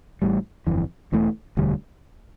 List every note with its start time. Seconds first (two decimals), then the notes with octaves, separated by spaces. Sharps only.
0.22 A1 A2 G3
0.67 G1 F2 E3
1.12 E1 E2 E3 A3
1.57 E1 D2 D3 G3